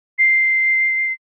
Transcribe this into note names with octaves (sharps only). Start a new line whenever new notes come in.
C7